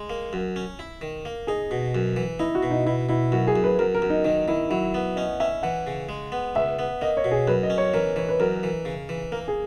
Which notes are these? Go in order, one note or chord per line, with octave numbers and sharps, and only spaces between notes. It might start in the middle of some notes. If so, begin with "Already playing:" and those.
Already playing: G#3
A#3
F#2
C#4
E4
D#3
A#3
D#4 G#4
B2
F#2
E3
D#4 E4
F#4
B2
D#4
B2 E4
B2 E4
F#2 F#4
G#4
F#2
B4
F#2 A#4
A#4
F#2
D#4
D#3 D#4
D#3 E4
F#3 E4
B3
C#4 D#5
C#4 E5
E3 F#5
C#3
G#3
B3
C#2 E5
B3
A#3 D#5
C#5
B2
G#4
F#2 B4
D#5
C#4
C#5
E3 A#4
E3 C#5
B4
F#2 A#4
E3
C#3
E3
A#3 A#4
G#4